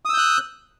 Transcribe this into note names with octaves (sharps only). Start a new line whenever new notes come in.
D#6 E6 F#6 G6